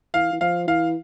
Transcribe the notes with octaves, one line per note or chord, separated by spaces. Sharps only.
E3 F5
E3
F3 F5
E3 F5